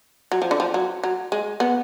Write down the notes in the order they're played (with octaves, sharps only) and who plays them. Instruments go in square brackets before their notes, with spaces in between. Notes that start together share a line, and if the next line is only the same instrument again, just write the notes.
[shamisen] F#3
F3
D3
F3
F#3
F#3
G#3
B3